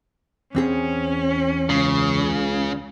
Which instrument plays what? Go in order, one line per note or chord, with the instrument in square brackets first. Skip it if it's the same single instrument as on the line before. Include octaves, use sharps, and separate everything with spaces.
[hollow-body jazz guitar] E2 C4 G#4 [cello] C#4
[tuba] C#2 [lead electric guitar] C#3